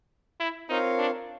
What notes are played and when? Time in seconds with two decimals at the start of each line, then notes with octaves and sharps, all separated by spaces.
0.40 E4
0.69 C4 D#4 F4 A#4 C#5 F5
0.99 D4